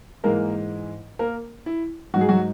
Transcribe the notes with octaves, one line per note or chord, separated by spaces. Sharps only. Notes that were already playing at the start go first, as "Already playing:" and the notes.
G#2 E3 G#3 A#3 A#4
A#3 A#4
E4
G#2 F#3 F#4
G#4
F#3 F#4